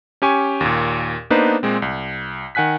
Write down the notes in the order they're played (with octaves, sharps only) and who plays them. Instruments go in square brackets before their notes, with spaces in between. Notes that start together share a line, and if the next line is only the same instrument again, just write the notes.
[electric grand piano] C#4 G4 G#5 C#6
D#2 A#2
A#3 B3 D4 D#4 B4 C5
A#2 G#3 C4
C2
D#3 F#5 G#5 F#6 B6